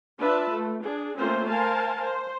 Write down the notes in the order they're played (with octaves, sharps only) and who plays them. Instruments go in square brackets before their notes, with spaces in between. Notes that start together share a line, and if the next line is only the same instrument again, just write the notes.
[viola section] D4 F4 B4 E5 A5
A3
D4 G#4
A3 A#3 C4 C#4 F4 C5
A#4 C5 F5 G#5 A5
C5